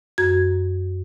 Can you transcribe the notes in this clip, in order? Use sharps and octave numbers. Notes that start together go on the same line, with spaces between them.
F#2 F#4 G#6